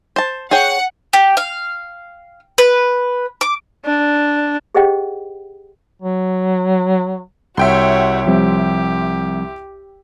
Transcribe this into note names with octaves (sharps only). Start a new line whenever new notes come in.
C5 A5
G#4 C#5 F#5 G5
G4
F5
B4
D6
D4
G4 G#4 C5 D#5 F#5 G5
F#3
C2 F#4 C#5 E5 G5 C6
F3 G3 C4 G4